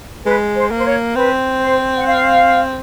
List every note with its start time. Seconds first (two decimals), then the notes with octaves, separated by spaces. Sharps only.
0.25 G#3 B4
0.55 C5
0.71 A#3
0.78 C5
0.85 C#5
1.16 C4 B4
1.61 C5
1.97 F#5
2.07 F5